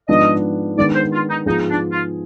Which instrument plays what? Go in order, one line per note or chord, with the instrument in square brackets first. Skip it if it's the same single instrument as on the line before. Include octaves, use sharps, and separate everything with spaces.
[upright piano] G#2 F3 G#3 B3 D4 [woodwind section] D#5
[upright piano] D#3 G#3 B3 D4 [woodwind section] D5
[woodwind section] C5
F4
D#4
[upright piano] G#2 F3 B3 F4 G#4 [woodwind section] D#4
[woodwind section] D4
F4